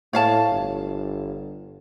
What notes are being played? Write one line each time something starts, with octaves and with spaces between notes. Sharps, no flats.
A2 C#5 F5 A5
G1